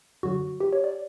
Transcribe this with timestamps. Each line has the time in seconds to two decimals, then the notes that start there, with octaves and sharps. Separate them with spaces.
0.23 F#2 D3 F#3 F#4
0.60 G4
0.73 C#5
0.84 D5